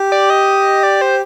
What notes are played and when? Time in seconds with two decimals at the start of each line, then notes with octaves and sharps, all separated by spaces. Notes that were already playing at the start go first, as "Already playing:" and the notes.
Already playing: G4
0.12 D5
0.30 D#5
0.83 D5
1.01 C5